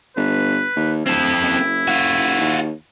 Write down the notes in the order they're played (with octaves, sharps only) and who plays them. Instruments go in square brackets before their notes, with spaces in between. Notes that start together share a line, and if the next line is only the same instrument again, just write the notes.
[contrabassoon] G1 [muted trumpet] B4
[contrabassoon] D#2
[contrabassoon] D1 [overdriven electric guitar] C4 A4 [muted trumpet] E4
[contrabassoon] F#1
[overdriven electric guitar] F4 F#4
[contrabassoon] D#2